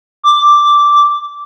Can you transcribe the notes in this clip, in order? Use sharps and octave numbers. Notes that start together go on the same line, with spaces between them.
D6